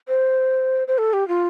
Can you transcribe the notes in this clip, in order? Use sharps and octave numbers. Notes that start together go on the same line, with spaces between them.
C5
C5
A4
G4
F4